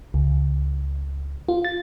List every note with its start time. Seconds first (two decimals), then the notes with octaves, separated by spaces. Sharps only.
0.14 C#2
1.49 F4
1.65 A6